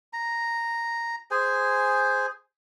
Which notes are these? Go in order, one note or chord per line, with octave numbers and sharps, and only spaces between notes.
A#5
G#4 C5 G#5